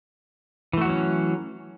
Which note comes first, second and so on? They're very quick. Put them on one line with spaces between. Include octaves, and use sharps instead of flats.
E3 A3 F#4 F#3 C#4